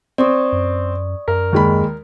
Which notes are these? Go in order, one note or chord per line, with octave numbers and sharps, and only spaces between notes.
C4 D5 C#6 D#6
F#2
F#2 A#4
D#2 G#3 B5